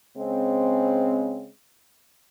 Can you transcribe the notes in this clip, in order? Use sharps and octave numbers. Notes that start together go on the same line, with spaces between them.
C#3 G#3 C4